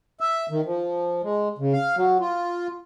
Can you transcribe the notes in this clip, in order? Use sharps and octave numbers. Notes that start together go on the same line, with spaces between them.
E5
D#3
F3
G#3
C#3
F5
F#3
F4